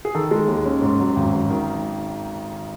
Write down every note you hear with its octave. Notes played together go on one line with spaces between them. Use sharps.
G#4
D#3 A4
G#3
D#2
C#4
G#2
F#3
G#1
G#1
D#3